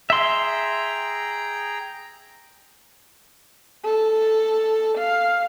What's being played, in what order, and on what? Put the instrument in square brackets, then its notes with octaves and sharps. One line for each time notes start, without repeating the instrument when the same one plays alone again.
[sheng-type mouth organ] G#4 G5 A#5 [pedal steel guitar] E5 C6
[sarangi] A4
F5